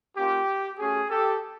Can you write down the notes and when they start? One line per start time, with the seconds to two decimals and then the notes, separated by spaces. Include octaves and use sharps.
0.17 A#3 C#4 F4 G4
0.79 A3 C#4 F#4 G#4
1.10 G4 A4